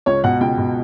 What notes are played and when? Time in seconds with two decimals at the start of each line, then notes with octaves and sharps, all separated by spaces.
0.06 C#2 C#5
0.24 B2 F#5
0.41 C#2 G5
0.58 B2